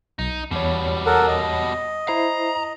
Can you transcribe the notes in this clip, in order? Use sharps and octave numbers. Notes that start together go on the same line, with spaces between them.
B1 D#4
E2 B2 G3 C#5
A4 A#4 F#5
D#5
E4 C5 A#5 C7